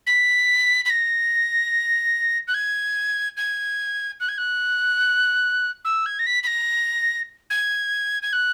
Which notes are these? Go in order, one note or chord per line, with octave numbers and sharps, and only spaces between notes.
B6
B6
A#6
F#6
G#6
G#6
F#6
G#6
F#6
E6
G#6
A#6
B6
B6
A#6
G#6
G#6
F#6